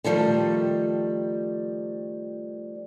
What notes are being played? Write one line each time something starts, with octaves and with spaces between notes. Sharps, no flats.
D3 D#3 F3 G3 A3